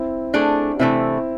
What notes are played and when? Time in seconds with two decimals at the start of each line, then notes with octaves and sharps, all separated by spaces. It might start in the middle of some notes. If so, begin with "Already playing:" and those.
Already playing: C4 E4
0.34 A3 D4 G#4
0.79 C3 E3 A3 C4 E4